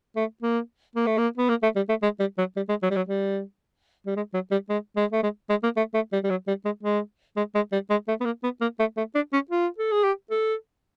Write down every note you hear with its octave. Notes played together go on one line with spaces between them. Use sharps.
A3
A#3
A#3
A3
A#3
B3
A#3
A3
G3
A3
G#3
G3
F#3
G3
G#3
F#3
G3
F#3
G3
G3
G#3
F#3
G3
G#3
G#3
A3
G#3
G#3
A#3
A3
A3
G3
G3
F#3
G3
G#3
G#3
G#3
G#3
G3
G#3
A3
B3
A#3
B3
A#3
A3
A3
D4
C#4
F4
A4
G#4
G4
A4